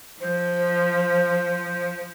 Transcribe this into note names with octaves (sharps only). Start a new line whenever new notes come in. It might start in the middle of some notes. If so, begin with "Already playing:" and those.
F3 C5